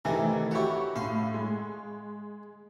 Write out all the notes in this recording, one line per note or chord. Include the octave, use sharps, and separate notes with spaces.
C3 D#3 E3 A3
E4 F#4 G4 C#5 C#6
A2 F5 C6
G#3